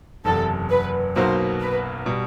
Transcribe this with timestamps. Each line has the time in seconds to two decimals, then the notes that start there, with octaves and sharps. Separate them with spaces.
0.25 F#1 E2 C3 A4
0.70 B4
1.16 B1 B2 F#3 A#3 C5
1.61 B4
2.06 B2 G3